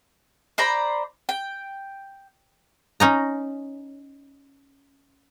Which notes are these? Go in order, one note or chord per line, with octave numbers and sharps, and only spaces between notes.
C5 D5 A#5 B5
G5
C#4 D#4 A#5